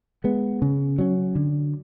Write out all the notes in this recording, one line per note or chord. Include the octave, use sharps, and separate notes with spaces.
G#3 B3
C#3
F#3 C#4
D3